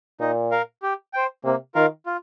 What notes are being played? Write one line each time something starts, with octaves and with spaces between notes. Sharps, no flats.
A#2 D#4
A#4 F5
G4
C5 G5
C3 A#3
D#3 F4 A#4 F5
F4